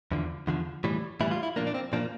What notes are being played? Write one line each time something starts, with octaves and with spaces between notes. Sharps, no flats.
E2 D3 F3
E2 D3 F3
A2 E3 G3
A2 E3 G3 E4
F4
E4
A#2 F3 A#3 D4
D4
C4
A#2 F3 A#3 D4